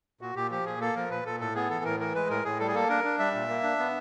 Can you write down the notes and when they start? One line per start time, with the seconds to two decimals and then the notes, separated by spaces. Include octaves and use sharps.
0.21 A#2 F#4
0.35 A#2 G4
0.51 F3 G4
0.66 A#2 G#4
0.81 A#3 A4
0.96 F3 A#4
1.11 A#2 B4
1.25 A#2 A4
1.40 A2 A4
1.55 B3 G#4
1.70 E3 A4
1.85 A2 A#4
1.99 E3 A#4
2.15 G#3 B4
2.30 A2 A#4
2.45 A2 G#4
2.59 G3 A4
2.67 G#4
2.74 A#3 A4
2.89 D4 A#4
3.04 D4
3.19 G3 E5
3.34 A#2
3.49 A#3
3.63 D4
3.79 B3